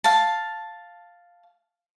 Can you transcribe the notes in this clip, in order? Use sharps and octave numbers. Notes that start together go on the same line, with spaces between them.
F5 A5